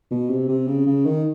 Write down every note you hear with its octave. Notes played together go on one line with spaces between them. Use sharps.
B2
C3
C3
C#3
C#3
D#3